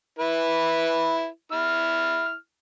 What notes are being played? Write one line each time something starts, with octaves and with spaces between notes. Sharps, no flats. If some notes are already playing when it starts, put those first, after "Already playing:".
E4 B4
E4 F6